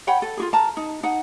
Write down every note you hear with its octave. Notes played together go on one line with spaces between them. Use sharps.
C#5 F#5 G5 B5
A4
F4 F#4 G#4
A#4 A5 A#5
D#4
D#4 F#5